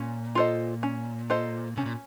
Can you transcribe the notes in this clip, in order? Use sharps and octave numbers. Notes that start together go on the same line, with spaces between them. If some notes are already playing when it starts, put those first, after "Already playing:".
Already playing: A#2 C#4
F4 A4 C5 D#5
C#4
F4 A4 C5 D#5
C3 C#4
A#2